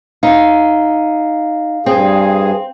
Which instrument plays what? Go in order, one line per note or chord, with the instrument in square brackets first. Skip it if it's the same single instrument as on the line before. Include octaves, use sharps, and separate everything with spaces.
[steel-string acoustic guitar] D#4 [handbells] F5
[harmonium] G2 G#4 [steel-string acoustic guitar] C4